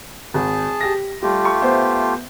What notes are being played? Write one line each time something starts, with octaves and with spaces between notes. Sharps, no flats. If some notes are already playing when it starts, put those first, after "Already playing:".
G#1 G#4 A5
G4 A#6
G3 A3 F4 G4
C#6
B3 C5 E5